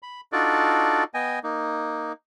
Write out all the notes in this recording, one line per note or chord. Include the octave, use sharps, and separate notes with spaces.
B5
D4 D#4 F4 F#4 A4 D5
B3 D#5 G5 G#5
A#3 D#4